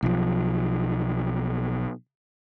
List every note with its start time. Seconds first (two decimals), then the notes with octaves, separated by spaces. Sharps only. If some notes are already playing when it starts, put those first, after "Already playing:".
0.03 B1 F3